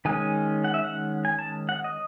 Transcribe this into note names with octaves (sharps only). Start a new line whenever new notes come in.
D#3 G#3 C#4 G#5
F#5
E5
F#5
G#5
A5
F#5
D#5